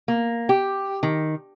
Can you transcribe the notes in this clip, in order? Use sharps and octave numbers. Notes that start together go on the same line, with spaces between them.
A#3
G4
D#3